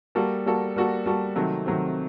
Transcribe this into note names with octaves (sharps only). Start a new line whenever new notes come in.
G3 A#3 F#4 A4
G3 A#3 F#4 A4
G3 A#3 F#4 A4
G3 A#3 F#4 A4
C3 D#3 F#3 A3 C4
C3 D#3 F#3 A3 C4